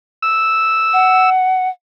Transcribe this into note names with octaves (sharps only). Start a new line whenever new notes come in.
E6
F#5